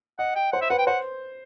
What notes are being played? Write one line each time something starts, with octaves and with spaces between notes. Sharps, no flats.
D#5 F#5
G5
C5 F#5
E5
B4 F#5
G5
C5 F#5